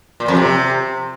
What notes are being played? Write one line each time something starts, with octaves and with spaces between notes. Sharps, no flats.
A#2
F2
C3